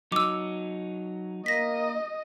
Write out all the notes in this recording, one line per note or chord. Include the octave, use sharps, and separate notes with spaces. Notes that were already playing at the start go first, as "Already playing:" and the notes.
F#3 D#4 D6 E6
A#3 D#5 A#6 B6